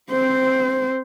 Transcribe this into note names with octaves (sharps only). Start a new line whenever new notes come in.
C4 C5